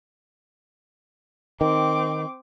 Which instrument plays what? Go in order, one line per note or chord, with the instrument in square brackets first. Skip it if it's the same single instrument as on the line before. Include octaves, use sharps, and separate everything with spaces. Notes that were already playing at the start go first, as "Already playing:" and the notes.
[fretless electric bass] D#3 [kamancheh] C4 D6